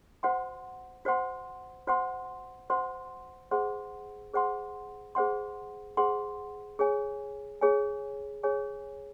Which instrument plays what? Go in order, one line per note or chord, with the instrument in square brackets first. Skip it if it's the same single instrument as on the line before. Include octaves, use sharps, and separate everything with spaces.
[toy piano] F#4 C5 F#5 C6
F#4 C5 F#5 C6
F#4 C5 F#5 C6
F#4 C5 F#5 C6
G#4 C5 F#5 C6
G#4 C5 F#5 C6
G#4 C5 F#5 C6
G#4 C5 F#5 C6
G#4 C#5 G#5
G#4 C#5 G#5
G#4 C#5 G#5